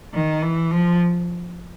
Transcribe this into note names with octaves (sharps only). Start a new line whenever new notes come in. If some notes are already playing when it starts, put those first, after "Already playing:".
D#3
E3
F3